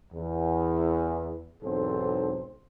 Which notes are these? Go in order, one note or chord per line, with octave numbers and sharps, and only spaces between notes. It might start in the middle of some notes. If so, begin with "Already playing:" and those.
E2
B1 E2 G#2 C4 A4 C5